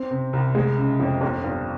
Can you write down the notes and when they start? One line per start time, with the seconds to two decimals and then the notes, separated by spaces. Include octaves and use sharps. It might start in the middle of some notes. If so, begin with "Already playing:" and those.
Already playing: C4
0.11 C3
0.33 C2
0.55 G#3
0.77 C#3
1.00 F2
1.21 G1
1.44 G2